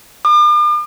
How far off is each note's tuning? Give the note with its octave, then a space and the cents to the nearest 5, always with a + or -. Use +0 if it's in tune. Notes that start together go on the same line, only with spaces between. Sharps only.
D6 +45